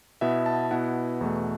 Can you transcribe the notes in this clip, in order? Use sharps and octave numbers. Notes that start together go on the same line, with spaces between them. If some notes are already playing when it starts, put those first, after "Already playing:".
B2 B3 E4 E5
A5
B2 B3 E4 F#5
E2 B2 A3